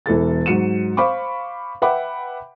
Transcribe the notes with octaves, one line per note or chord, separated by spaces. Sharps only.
E1 E3 A4 A6
G#2 F#3 C#7 D#7 E7
C5 F5 B5 C#6 D6
B4 E5 F#5 G5 B5 D6